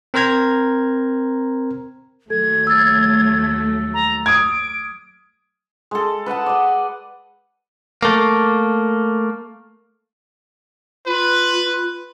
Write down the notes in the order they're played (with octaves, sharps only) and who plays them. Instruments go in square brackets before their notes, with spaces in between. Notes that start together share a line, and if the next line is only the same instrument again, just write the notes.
[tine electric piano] C4 A#4 C5 A#5 G#6
[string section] D#2 F#3 A3 [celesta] A4 [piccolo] G#6
[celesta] E6 A6
[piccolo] A#5
[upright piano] D#6 G#6 [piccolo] D7
[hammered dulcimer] G#3 A4
B4 D#5 F#5 A5
D5 D#5
[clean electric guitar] A3 A#3
[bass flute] F4 [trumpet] B4